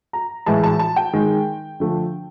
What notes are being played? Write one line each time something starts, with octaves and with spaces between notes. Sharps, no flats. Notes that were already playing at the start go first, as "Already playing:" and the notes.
A#5
A2 E3 G#3 A5
A5
A5
G5
D#3 G#3
D3 F3 A3